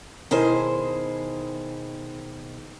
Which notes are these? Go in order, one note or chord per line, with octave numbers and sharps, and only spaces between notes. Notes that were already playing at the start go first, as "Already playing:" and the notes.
B2 D#3 E4 G#4 C5